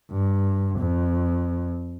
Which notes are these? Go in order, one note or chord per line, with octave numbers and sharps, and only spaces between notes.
G2
F2